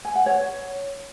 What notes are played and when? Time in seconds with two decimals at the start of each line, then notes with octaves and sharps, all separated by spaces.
0.05 G#5
0.15 F#5
0.26 C#5